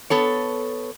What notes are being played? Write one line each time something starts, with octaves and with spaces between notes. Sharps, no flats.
B3 A4 C#5